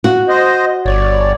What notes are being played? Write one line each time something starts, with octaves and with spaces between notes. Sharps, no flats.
F#4
C5 D#5
G1 C#5 D5